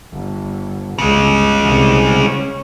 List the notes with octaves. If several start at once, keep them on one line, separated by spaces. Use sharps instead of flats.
G1
G1 C#2 C#3 G#3
C2
C#4